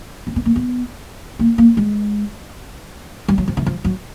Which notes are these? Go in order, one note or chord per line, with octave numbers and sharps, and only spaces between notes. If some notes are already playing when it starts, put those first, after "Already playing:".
C4
B3
A#3
B3
A#3
A#3
G#3
G3
F#3
F3
E3
F3
F#3